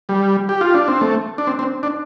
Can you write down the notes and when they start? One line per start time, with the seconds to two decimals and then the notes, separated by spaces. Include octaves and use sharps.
0.09 G3
0.49 G4
0.61 F4
0.75 D4
0.88 C4
1.01 A3
1.38 D4
1.47 C4
1.59 C4
1.83 D4